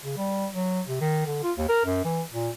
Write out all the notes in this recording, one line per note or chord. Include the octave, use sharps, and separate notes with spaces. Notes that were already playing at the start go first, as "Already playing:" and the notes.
C#3
G3
F#3
C3
D#3
D3
F4
D#2
A#4
F#2
E3
A#2